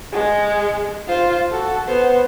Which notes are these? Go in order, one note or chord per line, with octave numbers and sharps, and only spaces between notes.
G#3
F4 C5
F#4 A4
B3 C5